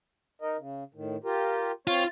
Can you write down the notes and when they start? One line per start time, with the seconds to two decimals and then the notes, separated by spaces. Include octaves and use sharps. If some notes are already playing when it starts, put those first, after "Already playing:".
0.42 D#4 A#4 D#5
0.57 C#3
0.94 A2 D#3
1.24 F4 G4 A#4
1.87 C4 F4 C#5